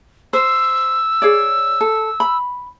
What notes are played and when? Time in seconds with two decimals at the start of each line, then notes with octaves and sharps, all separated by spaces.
0.33 C5 E6
1.22 G#4 C#5 D5
1.81 A4
2.20 B5